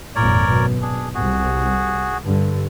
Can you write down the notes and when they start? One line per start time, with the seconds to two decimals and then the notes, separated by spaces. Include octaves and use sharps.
0.16 G#1 F2 A#2 A#4 C#5 D5
0.46 F#2 B2
0.82 D4 G#4
1.14 C2 F#4 G#4
2.23 G2 D3